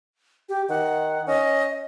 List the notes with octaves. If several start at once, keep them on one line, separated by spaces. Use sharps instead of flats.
G4
D#3 F#5
C#4 D#5